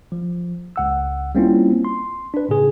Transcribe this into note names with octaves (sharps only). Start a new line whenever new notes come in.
F3
C#2 F#5 E6
G3 A#3 C4 C#4 E4 F4
C6
D4 B4
A2 C#3 G#4